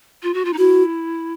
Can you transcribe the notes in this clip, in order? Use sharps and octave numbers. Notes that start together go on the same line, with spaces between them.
F4
F#4
F4
D#4
E4 F#4